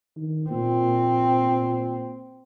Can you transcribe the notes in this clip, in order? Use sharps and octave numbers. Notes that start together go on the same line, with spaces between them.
D#3
A#2 C4